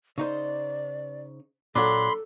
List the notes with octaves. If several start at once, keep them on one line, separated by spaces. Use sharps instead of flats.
C#3 D#4 C5 D5
A#2 F#3 D4 A4 B5 C6